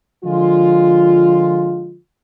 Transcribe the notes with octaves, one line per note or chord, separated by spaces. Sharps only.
D3 F3 G#3 F4